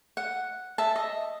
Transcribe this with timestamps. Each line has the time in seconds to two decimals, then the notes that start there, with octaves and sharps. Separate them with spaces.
0.17 F#5
0.78 E5 A5
0.96 D#5